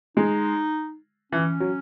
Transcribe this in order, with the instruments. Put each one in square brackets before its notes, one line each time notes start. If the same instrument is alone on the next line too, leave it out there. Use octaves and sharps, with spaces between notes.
[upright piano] G#3 [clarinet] D#4
[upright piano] E3 [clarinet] C#4
[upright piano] F#3